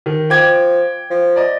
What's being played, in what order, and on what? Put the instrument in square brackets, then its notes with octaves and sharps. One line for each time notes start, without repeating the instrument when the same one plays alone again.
[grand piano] D#3
[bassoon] F3 [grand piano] G5 D6 G#6
[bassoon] F3
[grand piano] D5 D#5